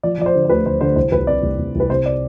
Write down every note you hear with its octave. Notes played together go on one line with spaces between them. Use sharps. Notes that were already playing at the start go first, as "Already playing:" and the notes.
F3 D5
F3 D5
C5
D3
C5
D2 B4
D2 C5
D3 C5
C2 C5
C2 B4
C3 D5
C2
C2
C2
B4
C3 C5
D5